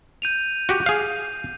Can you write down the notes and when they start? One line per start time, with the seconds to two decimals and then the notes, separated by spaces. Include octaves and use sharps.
0.22 G6 D#7 F7
0.69 F#4 G4
0.86 G#4 F5